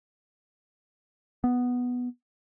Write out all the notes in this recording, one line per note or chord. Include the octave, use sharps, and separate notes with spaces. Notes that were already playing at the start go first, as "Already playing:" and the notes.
B3